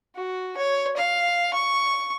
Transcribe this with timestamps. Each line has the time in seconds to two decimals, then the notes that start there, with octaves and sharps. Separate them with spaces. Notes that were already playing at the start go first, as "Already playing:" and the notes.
0.16 F#4
0.57 C#5
0.97 F5
1.54 C#6